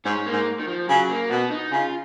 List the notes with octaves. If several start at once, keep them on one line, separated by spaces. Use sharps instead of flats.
G#2 C#4
A#3
G#2
D#3
F3
C#3 F#3
A#3
B2 B3
D#4
C#3 F4